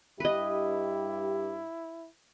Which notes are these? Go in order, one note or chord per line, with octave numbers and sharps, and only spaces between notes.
G2 E4 G4 B4 D#5